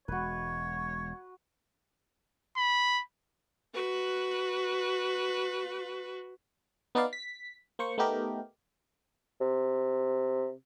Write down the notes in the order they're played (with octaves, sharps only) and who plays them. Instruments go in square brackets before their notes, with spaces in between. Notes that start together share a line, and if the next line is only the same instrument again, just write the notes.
[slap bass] E1 G#3 [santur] F#4 B4 [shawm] C#5
[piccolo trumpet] B5
[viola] F#4 B4
[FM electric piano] B3 D#4 B4 D5 F5
B6
A#3 C5 C#6
A3 B3 D#4 G4 A#4
[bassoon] C3